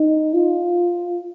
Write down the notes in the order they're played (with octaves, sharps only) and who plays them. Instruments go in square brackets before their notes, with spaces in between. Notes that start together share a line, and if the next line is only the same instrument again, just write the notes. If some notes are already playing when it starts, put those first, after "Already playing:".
Already playing: [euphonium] D#4
F4